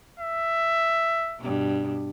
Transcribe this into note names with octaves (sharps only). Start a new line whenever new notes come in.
E5
G2 B2